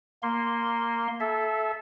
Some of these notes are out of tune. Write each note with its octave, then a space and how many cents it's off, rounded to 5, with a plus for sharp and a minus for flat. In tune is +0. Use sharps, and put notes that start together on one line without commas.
A#3 -5 C6 +0
A4 -25 E5 +0